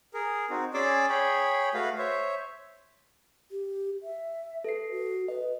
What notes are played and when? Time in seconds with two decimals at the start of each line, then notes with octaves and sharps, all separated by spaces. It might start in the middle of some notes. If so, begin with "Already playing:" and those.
0.14 G#4 A#4
0.50 C4 D#4 F#4
0.74 C#4 G#4 D5 C6 D6 E6
1.10 G#4 C#5 G5 B5
1.74 A3 F#4 B4 F5
1.98 C5 C#5 E5
3.51 G4
4.03 E5
4.64 A4 B4 C7
4.91 F#4
5.28 B4 D#5